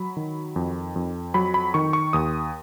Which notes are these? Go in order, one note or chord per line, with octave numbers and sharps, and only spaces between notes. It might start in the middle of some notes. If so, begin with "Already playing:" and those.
Already playing: F#3 B5
D#3
F2
F2
F#3 B5
B5
D#3 C#6
C#6
D#2 D#6